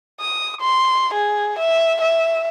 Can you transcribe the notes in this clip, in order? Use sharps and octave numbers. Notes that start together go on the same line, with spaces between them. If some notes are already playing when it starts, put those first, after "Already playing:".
D#6
C6
G#4
E5
E5